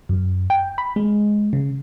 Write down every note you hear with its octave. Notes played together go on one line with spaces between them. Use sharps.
F#2
G5
B5
G#3
C#3